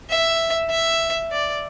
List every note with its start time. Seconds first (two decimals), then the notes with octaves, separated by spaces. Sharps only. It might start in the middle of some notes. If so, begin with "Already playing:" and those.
0.10 E5
0.70 E5
1.31 D5